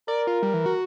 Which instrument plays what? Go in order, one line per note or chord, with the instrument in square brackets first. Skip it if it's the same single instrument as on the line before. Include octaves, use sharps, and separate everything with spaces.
[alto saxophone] A#4 [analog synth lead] D5
[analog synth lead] F4
G3
E3
F#4